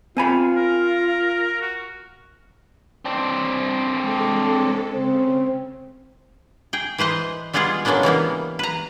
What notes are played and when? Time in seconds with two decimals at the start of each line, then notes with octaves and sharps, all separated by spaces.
0.17 C4 F4 G#5 B5
0.56 A#4
1.61 F#4
3.05 C4 D4
3.98 G#3 A4
4.94 C#3 C4
6.73 G#4 G5
6.98 E3 B4 C5 D#5
7.53 G3 G#3 B3 F4 G#4 F#5
7.85 C#3 F#3 G#3 A#3 B3 D4
8.03 E3 G3 A#3 B3
8.59 B4 A#5